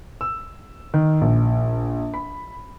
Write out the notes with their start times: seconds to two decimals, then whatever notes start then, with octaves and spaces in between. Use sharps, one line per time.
0.21 E6
0.94 D#3
1.21 A#1
2.14 B5